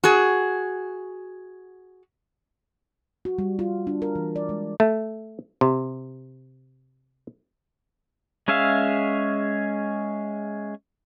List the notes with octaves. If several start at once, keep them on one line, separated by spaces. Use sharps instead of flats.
F#4 G#4
F#4
G3
F4
D4
A#4
E3
D5
G#3
A3
C3
G#3 C#4 G#4 E5 F5